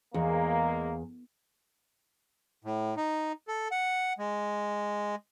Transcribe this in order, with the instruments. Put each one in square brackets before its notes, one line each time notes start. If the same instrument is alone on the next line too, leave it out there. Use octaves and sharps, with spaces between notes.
[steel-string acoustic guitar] E2 [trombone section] G#3 A#3
[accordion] A2
D#4
A4
F#5
G#3